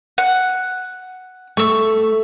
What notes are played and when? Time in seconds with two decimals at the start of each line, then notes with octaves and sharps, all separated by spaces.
0.18 F#5
1.57 A3 C#6 E6